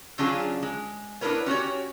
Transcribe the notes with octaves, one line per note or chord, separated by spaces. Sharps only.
C#3 F#3 C#4 D4 F4 G#4
G#3
B3 D4 E4 A#4 B4 C#5
C#4 F#4 G4 C#5